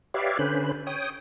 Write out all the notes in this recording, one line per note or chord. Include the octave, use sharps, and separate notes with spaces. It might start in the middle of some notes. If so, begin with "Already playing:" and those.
G4 B4 C#5 D5 E5 F5
D3 C#4 B4 C5 B5
C#5 G5 D#6